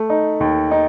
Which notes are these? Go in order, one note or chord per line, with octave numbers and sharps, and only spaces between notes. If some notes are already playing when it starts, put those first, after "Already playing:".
Already playing: A3
D#4
D#2
D#4